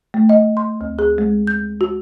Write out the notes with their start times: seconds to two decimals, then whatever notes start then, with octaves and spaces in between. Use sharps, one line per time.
0.14 A3
0.29 D#5
0.57 C6
0.81 D2
0.99 G#4
1.18 G#3
1.47 G6
1.81 F#4